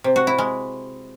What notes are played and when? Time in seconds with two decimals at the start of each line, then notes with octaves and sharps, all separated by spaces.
0.04 C3
0.16 F#4
0.27 E4
0.38 G#3